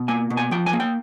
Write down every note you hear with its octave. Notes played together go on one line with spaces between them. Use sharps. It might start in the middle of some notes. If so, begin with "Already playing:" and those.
Already playing: B2
A#3 G#5
B2
G#5
F3 G5
G#5
A#3
G5